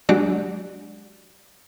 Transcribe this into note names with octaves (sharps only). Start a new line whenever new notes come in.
F#3 G#3 D4 F#4 G4 D5